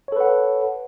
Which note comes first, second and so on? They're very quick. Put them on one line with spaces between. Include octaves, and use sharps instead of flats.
C#5 A4 B4 F#5